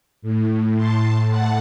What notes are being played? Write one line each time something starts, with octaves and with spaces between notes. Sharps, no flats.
A2
A5 C6
F#5 A5